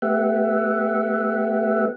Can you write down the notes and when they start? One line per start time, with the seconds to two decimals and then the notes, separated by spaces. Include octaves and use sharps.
0.02 A3 B3 G4 E5 F#5